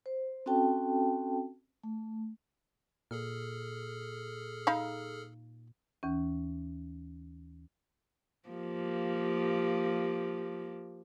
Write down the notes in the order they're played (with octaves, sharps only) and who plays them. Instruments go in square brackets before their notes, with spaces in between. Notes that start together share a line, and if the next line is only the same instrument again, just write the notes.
[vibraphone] C5
C4 C#4 F#4 A4 G5 A5
A3
[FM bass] A#2 [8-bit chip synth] G#4 A4 F6
[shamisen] D#4 F5 B5
[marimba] D#2 E3 C#4
[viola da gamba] F3 A#3 G4